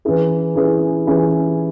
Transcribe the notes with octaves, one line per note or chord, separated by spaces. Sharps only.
E3 C#4 E4 G#4
E3 C#4 E4 G#4
E3 C#4 E4 G#4